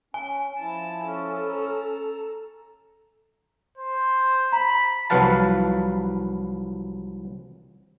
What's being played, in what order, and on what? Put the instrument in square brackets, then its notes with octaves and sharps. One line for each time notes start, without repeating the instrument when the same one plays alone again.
[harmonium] C#4 [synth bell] G#5
[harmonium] F3 E4 [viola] A5
[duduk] C#4 [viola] A4
[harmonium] A#5
[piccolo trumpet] C5
[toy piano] A#5 [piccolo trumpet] B5
[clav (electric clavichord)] C2 F3 F#3 B4 F5 A5